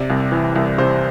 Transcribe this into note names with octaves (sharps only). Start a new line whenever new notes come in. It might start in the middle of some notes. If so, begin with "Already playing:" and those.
Already playing: C3 D5
C2
E3
C2
C3 C5